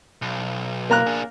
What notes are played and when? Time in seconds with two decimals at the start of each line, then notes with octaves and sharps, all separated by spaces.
0.22 B1
0.90 A#3 A#5 F#6
1.07 D4 G#4